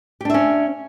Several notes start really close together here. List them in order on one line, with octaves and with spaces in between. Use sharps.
G4 D4 E5 C#4